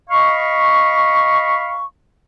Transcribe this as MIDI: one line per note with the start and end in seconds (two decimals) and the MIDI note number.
0.10 1.83 75
0.10 1.83 77
0.10 1.83 83
0.10 1.83 85